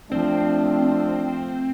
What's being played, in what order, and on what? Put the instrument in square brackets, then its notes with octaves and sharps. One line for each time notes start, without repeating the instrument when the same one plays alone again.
[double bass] F3 A3 [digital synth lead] C4 [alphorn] D4